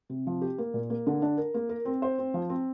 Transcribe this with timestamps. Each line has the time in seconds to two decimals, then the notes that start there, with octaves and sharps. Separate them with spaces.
0.10 C3
0.27 F3
0.42 G4
0.58 A#3
0.74 A#2
0.90 A#3
1.07 D3
1.22 D4
1.37 A#4
1.54 A#3
1.69 A#4
1.85 C4
2.02 C5
2.18 C4
2.34 F3
2.49 C4